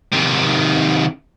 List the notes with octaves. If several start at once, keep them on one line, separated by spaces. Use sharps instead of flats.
C3 D#3